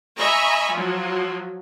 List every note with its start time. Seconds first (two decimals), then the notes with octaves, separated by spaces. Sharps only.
0.18 D#5 E5 G#5 A#5 B5 C#6
0.72 F3 F#3